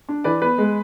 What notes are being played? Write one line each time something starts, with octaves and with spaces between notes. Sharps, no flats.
D4
E3 B4 D5
B3 B4
G#3